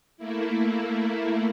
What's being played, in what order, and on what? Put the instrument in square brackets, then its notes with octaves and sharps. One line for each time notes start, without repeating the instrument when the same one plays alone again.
[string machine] A3 A#3 E4